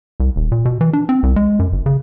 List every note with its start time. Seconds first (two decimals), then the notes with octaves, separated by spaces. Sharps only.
0.20 C2
0.36 D#1
0.52 A#2
0.65 B2
0.81 E3
0.93 D4
1.09 C4
1.23 C2
1.36 G#3
1.59 F#2
1.73 G1
1.86 C#3